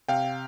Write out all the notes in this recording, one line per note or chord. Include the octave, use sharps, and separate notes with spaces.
C3 F5 G5